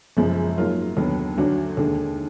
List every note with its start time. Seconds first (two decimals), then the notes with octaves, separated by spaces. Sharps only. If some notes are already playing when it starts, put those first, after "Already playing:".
0.17 F#1 F#2 F3 G#3
0.57 G#2 F#3 A#3 F4
0.97 D#2 D3 F#3 B3
1.37 D2 D3 F#3 D4 F#4
1.77 D#2 D3 G#3